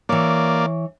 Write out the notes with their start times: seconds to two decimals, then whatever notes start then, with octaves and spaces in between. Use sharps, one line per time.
0.09 E3 A#3 C#5 D5